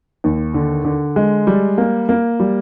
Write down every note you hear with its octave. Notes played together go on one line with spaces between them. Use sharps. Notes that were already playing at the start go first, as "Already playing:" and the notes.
D#2
D3
D3
G#3
G3
A#3
A#3
G3